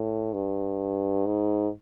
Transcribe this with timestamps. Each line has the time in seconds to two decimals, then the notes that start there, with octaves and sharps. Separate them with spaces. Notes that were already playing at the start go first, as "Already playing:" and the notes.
Already playing: A2
0.34 G2
1.26 G#2